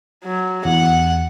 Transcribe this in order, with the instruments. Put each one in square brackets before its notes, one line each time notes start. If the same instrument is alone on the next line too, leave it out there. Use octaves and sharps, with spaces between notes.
[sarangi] F#3
[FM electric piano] E2 [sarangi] F#5